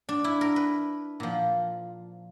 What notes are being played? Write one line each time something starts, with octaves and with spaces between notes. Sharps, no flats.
D4
E4
A#4
B4
A#2 F3